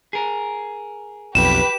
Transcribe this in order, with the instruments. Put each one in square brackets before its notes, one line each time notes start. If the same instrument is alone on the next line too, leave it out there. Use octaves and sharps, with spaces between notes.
[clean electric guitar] G#4 A#4
[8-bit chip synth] B1 F2 [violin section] G4 B4 [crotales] E7